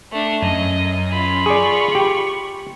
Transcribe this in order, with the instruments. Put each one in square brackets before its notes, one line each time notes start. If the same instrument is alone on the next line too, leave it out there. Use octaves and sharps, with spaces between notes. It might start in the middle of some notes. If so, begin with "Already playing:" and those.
[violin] A3 D4
[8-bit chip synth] F#2 [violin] D#5
[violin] F4 B5
[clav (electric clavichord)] G#4 D5 [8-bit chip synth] C#6
[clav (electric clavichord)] G4